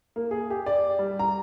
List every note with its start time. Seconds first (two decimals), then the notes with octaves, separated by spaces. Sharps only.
0.16 A#3
0.31 G#4
0.50 G4
0.66 D5
0.99 G3
1.19 A#5